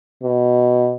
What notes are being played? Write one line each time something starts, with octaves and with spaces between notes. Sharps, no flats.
B2